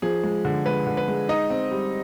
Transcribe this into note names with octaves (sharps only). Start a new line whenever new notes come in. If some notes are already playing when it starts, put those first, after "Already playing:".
F3 G#4
G#3
D3
G#3 B4
D3
B4
G#3
D#4 D#5
C4
G3